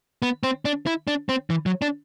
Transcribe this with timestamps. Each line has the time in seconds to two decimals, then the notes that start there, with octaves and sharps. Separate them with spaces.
0.22 B3
0.43 C4
0.65 D4
0.86 E4
1.08 D4
1.29 C4
1.50 E3
1.66 F#3
1.82 D4